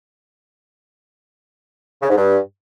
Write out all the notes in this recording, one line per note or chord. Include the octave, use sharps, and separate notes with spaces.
C#3
G#2
G2